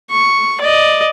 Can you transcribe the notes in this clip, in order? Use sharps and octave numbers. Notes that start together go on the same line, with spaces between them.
C#6
D5 D#5